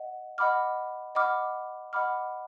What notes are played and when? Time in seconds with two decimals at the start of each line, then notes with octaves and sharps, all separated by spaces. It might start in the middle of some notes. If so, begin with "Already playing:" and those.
Already playing: D#5 F#5
0.38 D#5 F#5 B5 D6 F6
1.15 D#5 F#5 B5 D6 F6
1.93 D#5 F#5 B5 D6 F6